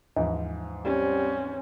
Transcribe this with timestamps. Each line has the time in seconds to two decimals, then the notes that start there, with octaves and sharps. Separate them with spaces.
0.17 D#2 G#2 E3 F3
0.85 G3 C4 C#4